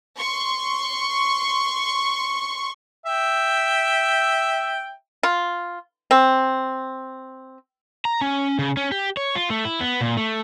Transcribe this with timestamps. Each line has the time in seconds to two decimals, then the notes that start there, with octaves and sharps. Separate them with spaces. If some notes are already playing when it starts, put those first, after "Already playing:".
0.16 C6 C#6
3.06 E5 G5
5.23 F4
6.11 C4
8.05 A#5
8.21 C#4
8.59 C#3
8.77 C#4
8.92 G4
9.17 C#5
9.35 F4
9.50 A3
9.65 E4
9.80 B3
10.01 A#2
10.17 A3